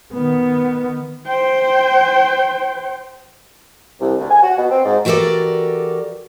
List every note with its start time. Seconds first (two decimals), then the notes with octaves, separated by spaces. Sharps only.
0.13 D#3 B3
1.27 C5 G5
4.00 C2
4.19 D2
4.30 G#5
4.43 F#4
4.57 B2
4.71 C4
4.85 G#2
5.05 E3 F#4 G4 A4 A#4 D5